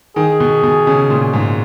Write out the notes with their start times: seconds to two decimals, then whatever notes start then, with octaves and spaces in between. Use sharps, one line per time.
0.16 D#3 G#4
0.40 B2
0.63 B2
0.87 C#3
1.10 A#2
1.33 G#2